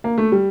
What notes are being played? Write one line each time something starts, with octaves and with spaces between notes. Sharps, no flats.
A#3
A3
G3